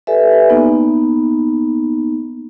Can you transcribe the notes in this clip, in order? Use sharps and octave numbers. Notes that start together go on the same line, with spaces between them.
G4 A4 B4 D5 E5 G#5
A#3 B3 D#4